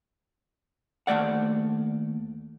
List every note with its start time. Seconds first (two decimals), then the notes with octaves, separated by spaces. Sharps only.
1.07 D#2 A3 D5 F#5